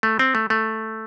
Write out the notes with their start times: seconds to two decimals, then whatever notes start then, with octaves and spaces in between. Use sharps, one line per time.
0.03 A3
0.19 C4
0.35 A3
0.50 A3